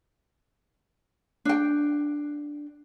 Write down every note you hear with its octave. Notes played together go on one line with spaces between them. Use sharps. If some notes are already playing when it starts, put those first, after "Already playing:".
D4 G5